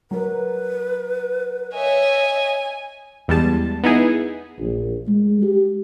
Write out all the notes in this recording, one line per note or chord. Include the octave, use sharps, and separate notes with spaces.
F#3 A#4 B4
C#5 D#5 E5 G#5
E2 G3 G#3 A5
B3 D#4 E4 G#4
A#1
G#3
G4